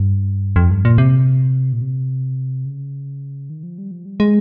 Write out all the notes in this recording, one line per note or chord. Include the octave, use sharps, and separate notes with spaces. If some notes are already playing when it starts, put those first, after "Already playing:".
Already playing: G2
F2
G2
A#2
C3
A#2
C3
C#3
D#3
F3
G3
F3
G3
G#3